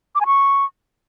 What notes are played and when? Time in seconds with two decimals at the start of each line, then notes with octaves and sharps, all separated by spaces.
0.15 D6
0.21 G#5
0.26 C#6